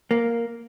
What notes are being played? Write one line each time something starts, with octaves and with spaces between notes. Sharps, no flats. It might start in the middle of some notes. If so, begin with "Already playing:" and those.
A#3